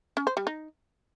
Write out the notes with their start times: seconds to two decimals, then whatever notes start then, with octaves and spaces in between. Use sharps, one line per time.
0.17 C#4
0.27 C5
0.37 G3
0.47 D#4